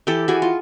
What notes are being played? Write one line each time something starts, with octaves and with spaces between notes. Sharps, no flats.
E3 G4 A4
E3 F#4 G#4
F4